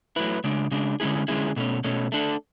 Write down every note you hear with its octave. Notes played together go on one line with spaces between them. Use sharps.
F#3 A3 E4 B4
C#3 G#3 D4
C#3 G#3 D4
D3 G#3 C#4 E4 G#4
D3 G#3 C#4 E4 G#4
B2 A3 C#4
B2 A3 C#4
A3 D4 A4